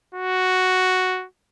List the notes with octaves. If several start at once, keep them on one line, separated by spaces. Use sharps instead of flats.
F#4